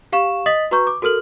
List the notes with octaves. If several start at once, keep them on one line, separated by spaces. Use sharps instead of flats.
G4 F5 C#6 E7
D#5 D#6 A6 B6 F#7
F#4 B4 A#5 C#6 G6
D6
F#4 A4 A#4 F6 F#7